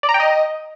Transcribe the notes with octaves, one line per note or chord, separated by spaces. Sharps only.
D5
A#5
G5
D#5